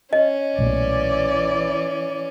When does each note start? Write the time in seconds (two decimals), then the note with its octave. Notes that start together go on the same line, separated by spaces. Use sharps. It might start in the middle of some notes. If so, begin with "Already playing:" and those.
0.13 C#4 D#5
0.59 B1 A#2 E3 A3 D5